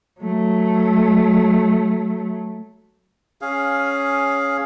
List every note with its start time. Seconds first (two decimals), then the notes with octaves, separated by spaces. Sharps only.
0.21 F#3 A3
3.41 C#4 G#4 F5